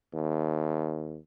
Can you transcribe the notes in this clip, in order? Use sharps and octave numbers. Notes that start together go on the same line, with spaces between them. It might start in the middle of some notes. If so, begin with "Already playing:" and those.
D#2